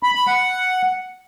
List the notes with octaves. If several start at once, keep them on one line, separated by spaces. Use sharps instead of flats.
B5
B5
F#5